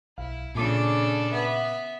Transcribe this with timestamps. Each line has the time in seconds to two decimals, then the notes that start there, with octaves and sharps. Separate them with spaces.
0.18 B1 E4 F5
0.55 A#2 C#3 D4 A4 D6
1.32 B3 E5